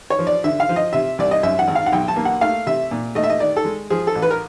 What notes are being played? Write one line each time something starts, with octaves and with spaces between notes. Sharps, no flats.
C#5
F3
D5
D3 E5
F5
F3
D#5
C3 E5
C2 D5
D#5
F#2 E5
F#5
G#1
F5
F#5
B1 G5
A5
A#3
F#5
A3 F5
C3 E5
A#2
A3 D#5
E5
D#5
D#3 D5
A4
G#3
F3 G#4
A4
A1
B4
A#4